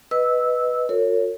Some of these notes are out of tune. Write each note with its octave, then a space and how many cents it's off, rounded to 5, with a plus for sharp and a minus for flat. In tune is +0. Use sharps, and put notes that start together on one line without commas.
B4 +0 D#5 +0 E6 -10
F#4 -45 A#4 -40 C#5 +0